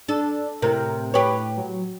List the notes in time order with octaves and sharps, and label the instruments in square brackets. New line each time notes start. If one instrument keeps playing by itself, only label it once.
[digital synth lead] D4 [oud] A4
[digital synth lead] A2 [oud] C3 [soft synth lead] A#4
[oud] G4 C#5 [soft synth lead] B4
[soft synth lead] F#3